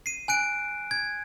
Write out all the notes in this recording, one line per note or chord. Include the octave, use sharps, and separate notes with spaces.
C7 D#7
G#5 F#6 D7
G#6